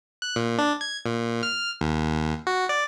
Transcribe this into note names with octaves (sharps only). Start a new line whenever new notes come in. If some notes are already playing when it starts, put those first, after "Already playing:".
F#6
A#2
D4
G#6
A#2
F6
D#2
F#4
D5